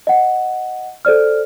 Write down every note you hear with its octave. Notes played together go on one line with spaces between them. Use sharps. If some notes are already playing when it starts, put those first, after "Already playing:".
D#5 F#5
A4 C5 D5 F6